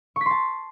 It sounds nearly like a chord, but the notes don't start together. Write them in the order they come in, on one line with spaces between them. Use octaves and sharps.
C#6 B6 C6 A5